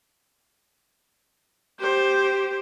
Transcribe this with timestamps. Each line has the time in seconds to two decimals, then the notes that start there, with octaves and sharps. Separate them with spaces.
1.80 G4 C5